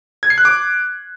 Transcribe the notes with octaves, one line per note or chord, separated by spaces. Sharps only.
G#6
C7
F#6
D6